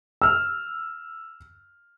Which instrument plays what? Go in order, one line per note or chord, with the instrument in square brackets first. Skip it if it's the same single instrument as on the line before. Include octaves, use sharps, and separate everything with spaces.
[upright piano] E6 F6